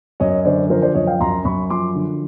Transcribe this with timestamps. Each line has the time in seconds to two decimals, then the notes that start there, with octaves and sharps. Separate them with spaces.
0.20 F#2 C#5 D#5
0.45 D3 C5 D5
0.70 F3 A#4 C5
0.82 C5 D5
0.95 F#2 C#5 D#5
1.07 F5 G5
1.20 F#2 A#5 C6
1.45 F#2 B5 C#6
1.70 F3 C6 D6
1.95 D3